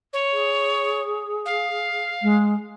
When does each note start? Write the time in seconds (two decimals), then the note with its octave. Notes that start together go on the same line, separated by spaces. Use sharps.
0.13 C#5
0.33 G#4
1.45 F5
2.22 G#3